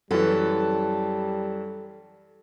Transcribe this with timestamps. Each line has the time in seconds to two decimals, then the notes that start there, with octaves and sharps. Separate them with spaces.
0.11 F#2 E3 G3 A4